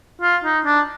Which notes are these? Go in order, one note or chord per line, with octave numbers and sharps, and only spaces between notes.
F4
D#4
D4